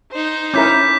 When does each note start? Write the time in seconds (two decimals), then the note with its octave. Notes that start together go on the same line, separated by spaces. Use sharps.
0.12 D#4 C5
0.54 C#4 E4 A#4 D6 G6 B6